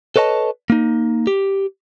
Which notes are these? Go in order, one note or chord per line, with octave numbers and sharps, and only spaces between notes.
A4 B4 C#5 D#5 A5
A#3 D#4
G4